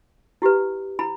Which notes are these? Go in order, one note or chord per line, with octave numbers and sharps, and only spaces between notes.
E4 G4 B4
E4 B5